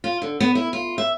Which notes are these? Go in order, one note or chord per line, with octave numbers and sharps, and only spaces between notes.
F4
D3
B3
E4
F4
E5